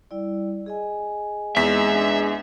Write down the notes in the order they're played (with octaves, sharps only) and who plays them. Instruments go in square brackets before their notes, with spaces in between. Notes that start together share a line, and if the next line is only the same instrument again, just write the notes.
[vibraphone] G3 E4 D5
G#4 D#5 G#5
[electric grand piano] E2 B6 [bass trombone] G#3 [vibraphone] C4 D#4 [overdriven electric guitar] E5
[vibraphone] D4